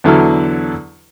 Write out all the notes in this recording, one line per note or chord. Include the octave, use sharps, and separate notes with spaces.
E2 D3 F#3 E4 A4 F6